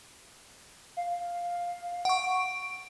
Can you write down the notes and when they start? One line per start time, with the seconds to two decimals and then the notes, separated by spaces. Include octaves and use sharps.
0.97 F5
2.05 F#5 C#6 D7